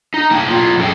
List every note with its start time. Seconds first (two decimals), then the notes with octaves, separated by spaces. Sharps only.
0.14 D#4
0.31 A#3 G5 A5
0.49 B2 F#3 F4
0.78 F#2 G#3 A4 G5